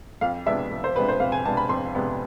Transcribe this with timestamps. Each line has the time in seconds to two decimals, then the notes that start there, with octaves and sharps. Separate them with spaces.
0.21 F2 F5
0.46 C3 G#3 B3 D4 E5
0.71 F2
0.84 C5
0.96 C3 G#3 B3 D4 B4
1.08 C5
1.20 F2 F5
1.32 G#5
1.45 C3 G#3 B3 D4 A5
1.57 B5
1.69 F2 C6
1.95 C3 G#3 B3 D4